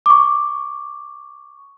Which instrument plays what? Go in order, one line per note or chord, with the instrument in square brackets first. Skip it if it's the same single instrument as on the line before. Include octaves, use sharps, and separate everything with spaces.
[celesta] C#6 D6